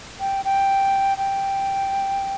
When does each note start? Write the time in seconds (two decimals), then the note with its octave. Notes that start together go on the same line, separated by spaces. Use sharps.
0.20 G5
0.45 G5
1.18 G5